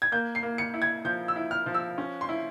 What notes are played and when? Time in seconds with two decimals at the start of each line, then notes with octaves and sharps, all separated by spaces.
0.02 G#6
0.12 A#3 G6
0.35 C7
0.43 A#3
0.58 C#7
0.74 E4
0.82 G#6
1.05 F3 G6
1.28 E6
1.36 E4
1.51 F6
1.66 F3
1.74 E6
1.98 C#4
2.21 C6
2.29 E4